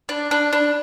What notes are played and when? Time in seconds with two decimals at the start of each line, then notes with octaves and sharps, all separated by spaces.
0.09 D4
0.31 D4
0.53 D4